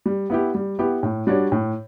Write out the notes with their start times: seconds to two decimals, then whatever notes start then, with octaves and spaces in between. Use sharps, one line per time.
0.06 G3
0.30 B3 E4 G4
0.55 G3
0.79 B3 E4 G4
1.03 A2
1.27 G3 D4 F#4 C#5
1.52 A2